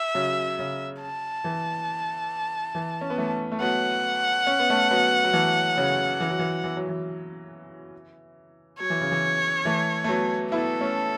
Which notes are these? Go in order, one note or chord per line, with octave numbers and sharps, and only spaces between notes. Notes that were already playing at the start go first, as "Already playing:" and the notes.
Already playing: E5
C#3 F#3
C#3
A5
E3
E3
C#4
B3
E3 A3
A3
F#3 B3 F#5
C#4
B3
A3 C#4
F#3 B3
F#3
E3 A3
C#3 F#3
E3
F#3
E3
E3
F#3
E3
F#3 C#5
E3
C#3
E3
E3 A3
A3
F#3 B3
B3 E4 A4
A3 C#4